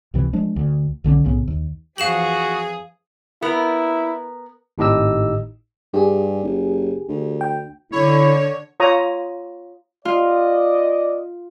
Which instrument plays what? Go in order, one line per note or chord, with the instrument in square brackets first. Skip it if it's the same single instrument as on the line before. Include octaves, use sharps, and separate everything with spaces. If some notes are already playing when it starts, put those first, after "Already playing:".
[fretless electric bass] C#2 C3 E3
F3 G#3 D4
D2
B1 D3 F#3 C#4
B1 A2 C#3 B3
D#2
[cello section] F2 E3 F3 [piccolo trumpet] F#4 [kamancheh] G#4 [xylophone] F5 E7 F#7
[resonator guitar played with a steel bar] B3 A#4 [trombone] E4
[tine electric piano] G#1 A2 D#4 G4 D#5 E6
[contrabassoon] G2 [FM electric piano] G4 G#4
[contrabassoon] F#1
D2
[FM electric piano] G5
[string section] D3 [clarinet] E4 [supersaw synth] C#5
[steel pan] F4 C#5 A#5 D#6
[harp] F4 [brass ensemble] D5 D#5